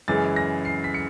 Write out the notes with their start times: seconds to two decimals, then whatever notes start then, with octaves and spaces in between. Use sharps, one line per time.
0.08 F#2 C#3 E3 G#3 A6
0.36 A#6
0.65 C7
0.84 B6
0.94 C#7